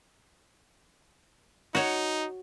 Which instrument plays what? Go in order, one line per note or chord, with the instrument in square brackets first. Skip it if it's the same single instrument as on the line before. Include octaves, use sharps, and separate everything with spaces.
[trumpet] D#4 [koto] F#4 C#5